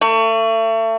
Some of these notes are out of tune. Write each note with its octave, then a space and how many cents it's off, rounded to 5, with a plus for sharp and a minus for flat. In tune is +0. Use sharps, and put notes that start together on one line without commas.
A3 +35